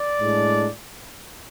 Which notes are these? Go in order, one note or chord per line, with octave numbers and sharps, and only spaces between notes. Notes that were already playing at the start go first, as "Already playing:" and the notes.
Already playing: D5
A2 G#3 D4